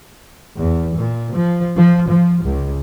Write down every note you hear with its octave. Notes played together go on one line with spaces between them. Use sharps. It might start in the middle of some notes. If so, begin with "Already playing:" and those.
E2
A#2
F3
F3
F3
C#2